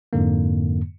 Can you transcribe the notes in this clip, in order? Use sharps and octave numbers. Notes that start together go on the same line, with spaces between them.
F2 G#2 D3 A#3